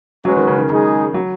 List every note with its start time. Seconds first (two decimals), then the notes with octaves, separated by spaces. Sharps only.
0.25 F#3 G#3 C#4 F#4 B4
0.36 D#3
0.47 C#3
0.59 D#3
0.70 C#3 G#3 D#4 G#4
1.14 F#3